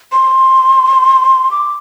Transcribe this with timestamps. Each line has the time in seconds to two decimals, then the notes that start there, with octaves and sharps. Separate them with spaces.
0.12 C6
1.51 D6